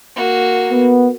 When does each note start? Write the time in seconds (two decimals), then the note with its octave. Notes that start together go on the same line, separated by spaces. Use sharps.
0.16 A#3 F#4
0.71 B3